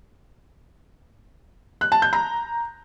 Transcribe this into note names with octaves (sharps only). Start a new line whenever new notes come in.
F#6
A5
G6
A#5